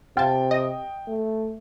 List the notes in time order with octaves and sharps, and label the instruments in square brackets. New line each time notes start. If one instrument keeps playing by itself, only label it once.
[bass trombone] C3 [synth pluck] F4 A5 [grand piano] G5
[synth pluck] D#5
[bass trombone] A3